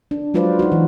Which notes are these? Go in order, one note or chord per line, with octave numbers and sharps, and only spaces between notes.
D4
F#3 G#3 F4 B4 C5 D5
D#4 F#4
E3